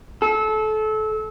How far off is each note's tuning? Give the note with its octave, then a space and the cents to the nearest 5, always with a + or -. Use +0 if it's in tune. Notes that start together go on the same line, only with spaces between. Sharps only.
A4 -25